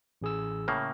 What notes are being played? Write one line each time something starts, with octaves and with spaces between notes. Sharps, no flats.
A1 G#4 E6
A2 C#3 A#3